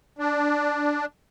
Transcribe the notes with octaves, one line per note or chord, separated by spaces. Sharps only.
D4